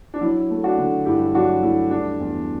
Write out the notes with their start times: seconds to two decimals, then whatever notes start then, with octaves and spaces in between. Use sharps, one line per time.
0.14 D4
0.21 F#3 E4
0.50 A3
0.64 D4 F#4
0.78 D3
1.06 G2 E4 G4
1.34 F#3 D4 F#4
1.62 A3 E4
1.91 G3 D4
2.20 E2